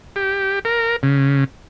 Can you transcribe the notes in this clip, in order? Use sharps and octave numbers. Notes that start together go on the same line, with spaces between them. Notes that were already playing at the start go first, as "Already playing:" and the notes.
G4
A#4
C#3